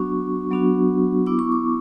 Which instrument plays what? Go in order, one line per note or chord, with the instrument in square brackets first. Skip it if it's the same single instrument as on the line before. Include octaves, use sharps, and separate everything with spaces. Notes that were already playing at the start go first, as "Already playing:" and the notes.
Already playing: [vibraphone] F#3 B3 D4 F#4 C#6
F#3 B3 D4 F#4
B3 E4 D6
C#6
D6